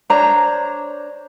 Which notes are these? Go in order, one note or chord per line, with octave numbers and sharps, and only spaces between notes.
D4 C5 C#5 A#5